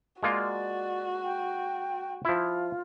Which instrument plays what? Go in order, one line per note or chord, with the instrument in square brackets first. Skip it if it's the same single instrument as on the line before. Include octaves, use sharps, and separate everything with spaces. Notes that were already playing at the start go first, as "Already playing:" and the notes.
[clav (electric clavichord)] G#3 A#3 F4 [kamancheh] F#4 [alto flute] D5
[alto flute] G5
[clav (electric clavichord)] F3 E4 [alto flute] F4